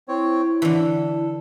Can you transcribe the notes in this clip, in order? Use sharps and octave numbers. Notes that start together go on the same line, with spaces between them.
C4 E4 C#5
D3 E3 A4